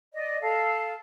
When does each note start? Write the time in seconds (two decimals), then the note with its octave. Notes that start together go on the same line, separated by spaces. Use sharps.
0.13 D5 D#5
0.42 A4 F5